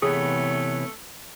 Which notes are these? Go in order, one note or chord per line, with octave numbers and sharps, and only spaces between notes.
C3 E3 A3 B3 G#4 C#5